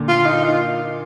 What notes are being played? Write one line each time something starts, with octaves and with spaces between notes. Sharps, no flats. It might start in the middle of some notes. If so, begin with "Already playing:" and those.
Already playing: A#2 D3
F4
D#4
F4